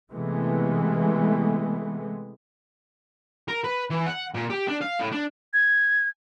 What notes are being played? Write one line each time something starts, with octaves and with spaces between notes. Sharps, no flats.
C3 E3 G#3 A3 B3
A#4
B4
E3
F#5
A#2
G4
D4
F5
A2
D4
G#6